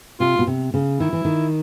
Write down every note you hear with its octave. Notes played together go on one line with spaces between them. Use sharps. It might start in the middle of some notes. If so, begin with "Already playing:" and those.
C3 F4
B2
C3
C#3
D#3 E4
E3
D#3